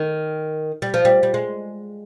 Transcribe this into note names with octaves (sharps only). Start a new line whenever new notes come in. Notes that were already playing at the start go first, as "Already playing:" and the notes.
Already playing: D#3
G3
F3
G3
G3
G#3